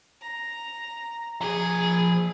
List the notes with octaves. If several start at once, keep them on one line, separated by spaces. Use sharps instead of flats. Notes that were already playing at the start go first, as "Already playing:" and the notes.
A#5
F3 G#4 A#5